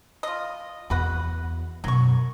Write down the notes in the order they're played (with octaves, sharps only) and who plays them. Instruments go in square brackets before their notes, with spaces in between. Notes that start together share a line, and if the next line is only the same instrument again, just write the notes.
[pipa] F4 D#5
[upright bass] E2 [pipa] F#4 B4 F#5
[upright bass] F#2 B2 [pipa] F#3 C#6